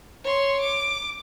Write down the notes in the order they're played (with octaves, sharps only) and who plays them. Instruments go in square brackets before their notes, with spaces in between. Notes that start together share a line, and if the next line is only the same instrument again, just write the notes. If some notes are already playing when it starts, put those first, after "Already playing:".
[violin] C#5 C6
D6